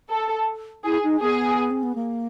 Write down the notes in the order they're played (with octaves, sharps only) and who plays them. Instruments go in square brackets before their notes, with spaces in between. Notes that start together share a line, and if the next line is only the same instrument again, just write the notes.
[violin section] A4
[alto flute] E4 [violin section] G#4
[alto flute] D#4
[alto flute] B3 [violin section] G#4
[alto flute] C4
B3
A#3